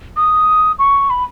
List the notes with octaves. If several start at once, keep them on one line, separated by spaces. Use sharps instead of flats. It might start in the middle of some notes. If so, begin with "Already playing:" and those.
D#6
C#6
B5